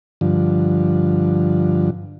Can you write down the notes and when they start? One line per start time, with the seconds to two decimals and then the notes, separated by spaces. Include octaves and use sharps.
0.21 G2 D3 F3